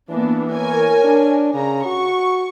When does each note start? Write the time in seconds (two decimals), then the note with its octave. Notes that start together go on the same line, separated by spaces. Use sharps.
0.10 E3 A#3 B3 D4
0.52 A#4 C#5 G#5
1.04 D4
1.55 C#3 A#5
1.86 F#4 C#6